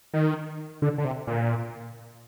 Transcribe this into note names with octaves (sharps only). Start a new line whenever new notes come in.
D#3
D3
D3
C3
A#2